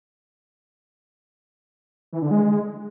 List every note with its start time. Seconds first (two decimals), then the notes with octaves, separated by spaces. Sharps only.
2.13 E3
2.22 D3
2.31 G#3